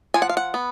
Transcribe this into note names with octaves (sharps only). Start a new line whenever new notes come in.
F3 G#5
F#5
F5
F#5
B3